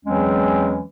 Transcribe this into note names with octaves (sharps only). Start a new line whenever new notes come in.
E2 E3 F#3 G#3 C4 C#4